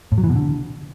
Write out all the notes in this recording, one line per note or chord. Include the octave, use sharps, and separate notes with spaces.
A2
F#3
E3
B2
D3